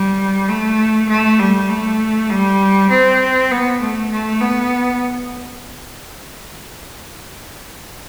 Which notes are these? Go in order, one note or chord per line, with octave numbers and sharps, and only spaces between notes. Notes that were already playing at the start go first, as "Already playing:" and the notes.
Already playing: G3
A3
A3
G3
A3
G3
C4
B3
A3
A3
B3